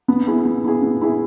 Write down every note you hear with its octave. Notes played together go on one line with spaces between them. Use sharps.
B3
E4 G#4
B3
E4 G#4
B3
E4 G#4